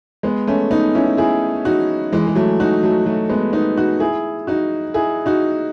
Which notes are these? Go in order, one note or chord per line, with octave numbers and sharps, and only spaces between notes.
G#3 B3
A3 C#4
B3 D#4
C#4 E4
E4 G#4
D#4 F#4
E3 G#3
G#3
F#3 A3
D#4 F#4
F#3 A3
F#3 A3
G#3 B3
B3 D#4
D#4 F#4
E4 G#4
D#4 F#4
E4 G#4
D#4 F#4